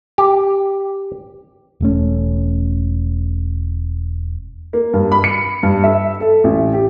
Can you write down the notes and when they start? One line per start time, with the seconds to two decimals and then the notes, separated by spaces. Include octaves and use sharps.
0.18 G4
1.81 E1 A3 C#4
4.73 A#3
4.93 G2
5.12 B5
5.24 C#7
5.63 G2
5.84 E5
6.20 A4
6.44 A1
6.73 G4